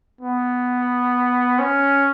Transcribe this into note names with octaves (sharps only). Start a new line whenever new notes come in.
B3
C#4